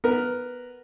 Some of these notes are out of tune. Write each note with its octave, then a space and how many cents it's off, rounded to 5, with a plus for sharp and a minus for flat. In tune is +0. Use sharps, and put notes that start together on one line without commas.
B3 +0 A#4 +0